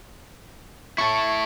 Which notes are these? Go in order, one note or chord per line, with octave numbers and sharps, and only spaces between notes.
E4 A4 C#6